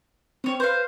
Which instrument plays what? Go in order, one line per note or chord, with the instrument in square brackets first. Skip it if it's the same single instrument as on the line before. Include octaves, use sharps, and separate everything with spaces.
[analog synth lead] C4 [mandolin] C#4 C#5
[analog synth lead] B4 [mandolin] C5 F5